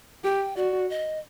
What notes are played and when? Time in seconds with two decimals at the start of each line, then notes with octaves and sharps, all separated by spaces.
0.24 G4 G5
0.57 F#4 D5
0.90 D#5